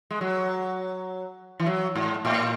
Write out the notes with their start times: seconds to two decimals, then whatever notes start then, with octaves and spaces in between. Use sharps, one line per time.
0.11 G#3
0.21 F#3
1.60 E3
1.66 F#3
1.96 G#2
2.25 A2